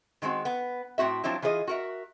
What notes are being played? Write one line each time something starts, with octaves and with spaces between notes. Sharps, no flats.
D#3 G#3 A3 C4 F#4
B3
A2 C4 F#4 E5
F3 F#3 C4 D4 E4
E3 F4 G#4 C#5 D#5
F#4 A#4 E5